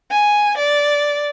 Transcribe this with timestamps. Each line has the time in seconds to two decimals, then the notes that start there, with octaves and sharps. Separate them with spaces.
0.11 G#5
0.58 D5